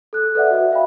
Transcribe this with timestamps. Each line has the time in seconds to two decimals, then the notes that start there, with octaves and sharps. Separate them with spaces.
0.13 A4 F#6
0.35 A4 B4 D5 E5 F#5
0.50 F#4 D#5 E5
0.71 E5 F5 G5 B5